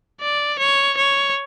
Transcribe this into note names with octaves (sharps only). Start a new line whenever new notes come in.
D5
C#5
C#5